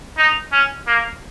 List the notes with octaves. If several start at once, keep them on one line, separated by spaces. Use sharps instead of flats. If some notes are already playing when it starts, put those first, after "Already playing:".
D#4
C#4
A#3